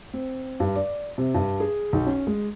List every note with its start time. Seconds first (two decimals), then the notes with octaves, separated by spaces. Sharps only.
0.14 C4
0.60 G2
0.76 D5
1.18 C3
1.35 G2
1.60 G#4
1.93 B1
2.07 C#4
2.27 G#3